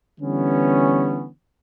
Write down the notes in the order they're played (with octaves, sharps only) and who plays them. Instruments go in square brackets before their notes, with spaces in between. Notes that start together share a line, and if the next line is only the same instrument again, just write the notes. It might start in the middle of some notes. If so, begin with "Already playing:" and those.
[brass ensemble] D3 E3 G3 B3 C#4